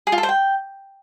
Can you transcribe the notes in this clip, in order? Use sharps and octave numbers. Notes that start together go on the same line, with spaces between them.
G#4
F4
A4
C5
G5